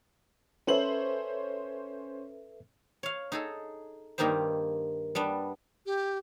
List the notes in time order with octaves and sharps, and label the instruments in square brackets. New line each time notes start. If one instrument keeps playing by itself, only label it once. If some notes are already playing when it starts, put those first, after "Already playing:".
[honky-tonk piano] C#4 C5 F#7 [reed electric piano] A4 B4 E5
[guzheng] C#5 F5
D#4 G#4 A4
G2 D#3 A#3 D#4 G4 C5
G3 B3 D4
[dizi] G4